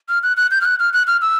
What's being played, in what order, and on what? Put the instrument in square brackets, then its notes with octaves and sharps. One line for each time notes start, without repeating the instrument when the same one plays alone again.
[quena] F6
F#6
F#6
G6
F6
F#6
F6
F#6
F6
E6